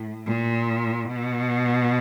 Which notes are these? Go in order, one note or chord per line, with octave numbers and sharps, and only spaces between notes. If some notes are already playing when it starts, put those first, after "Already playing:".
Already playing: A2
A#2
B2